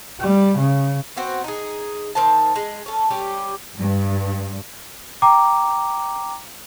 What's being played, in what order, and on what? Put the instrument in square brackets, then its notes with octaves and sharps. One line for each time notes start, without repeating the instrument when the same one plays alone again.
[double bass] G3
C#3
[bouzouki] B3 C4 F#4 C5
D#4 G#4
D#3 C5 E5 A5
G#3
C#4 A4
G3 C#4 G4
[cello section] G2
[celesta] G5 A#5 D6